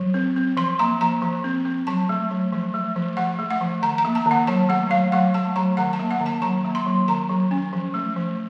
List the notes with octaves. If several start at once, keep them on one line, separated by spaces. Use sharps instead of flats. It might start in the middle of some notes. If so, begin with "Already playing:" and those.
Already playing: F#3
C4
C4
F3 C6
A#3 A#5
F3 A#5
F3
C4
C4
F#3 A5
A3
F#3
F3
A3
F3
F3 F#5
A3
F#5
F3
D#3 A#5
A#5
A#3
A5
D#3
F#5
F#3 A5
A3 F#5
F#3 F5
F#3 F#5
A3 A5
F#3 A#5
D#3 F#5
A5
A#3
F#5
D#3
A5
F#3 A#5
A#3
C6
F#3
D#3 A#5
F#3
C#4
F3
A3
F3